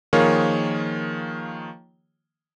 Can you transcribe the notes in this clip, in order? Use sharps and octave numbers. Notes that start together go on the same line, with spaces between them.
D#3 F3 A#3 F4 G#4 C#5